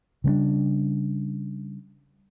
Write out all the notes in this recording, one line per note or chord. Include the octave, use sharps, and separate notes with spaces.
C#3 G3 B3 D4